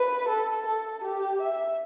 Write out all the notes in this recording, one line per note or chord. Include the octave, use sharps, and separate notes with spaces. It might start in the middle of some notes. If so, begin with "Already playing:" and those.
Already playing: B4
A4
A4
G4
E5